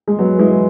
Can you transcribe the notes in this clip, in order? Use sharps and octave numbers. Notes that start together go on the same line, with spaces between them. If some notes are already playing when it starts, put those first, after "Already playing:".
G#3
F#3 B3
E3 G#3